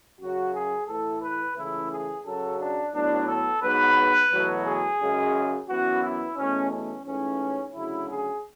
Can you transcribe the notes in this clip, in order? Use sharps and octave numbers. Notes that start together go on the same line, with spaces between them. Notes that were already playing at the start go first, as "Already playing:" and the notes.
F#2 C#3 F#3 F#4
G#4
A2 E3 A3 A4
B4
C#2 C#3 E3 A3 E4
G#4
F#2 C#3 F#3 A4
D4
A2 F#3 B3 D4
A4
G#2 F#3 B3 B4
E2 B2 F#3 A3
G#4
F#2 C#3 G#3
F#2 E3 B3 F#4
E4
E2 B2 A3 C#4
C#4
G#2 E3 A3 C#4
D2 C#3 F#3 E4
G#4